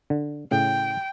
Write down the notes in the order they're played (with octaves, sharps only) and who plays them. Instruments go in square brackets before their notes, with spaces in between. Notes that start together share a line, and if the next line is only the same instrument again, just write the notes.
[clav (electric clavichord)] D3
[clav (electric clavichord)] A2 C#3 [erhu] G5